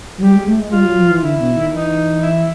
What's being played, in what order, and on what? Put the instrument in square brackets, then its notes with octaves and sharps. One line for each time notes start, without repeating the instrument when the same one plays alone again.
[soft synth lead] F#3
[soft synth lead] G3 [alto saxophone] G4
[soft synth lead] G#3
A3
G#3
[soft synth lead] G3 [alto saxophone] F4
[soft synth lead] F#3
F3
E3
[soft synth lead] D3 [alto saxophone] E4
[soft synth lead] B2
D#3
[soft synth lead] E3 [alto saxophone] D#4
[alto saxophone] E4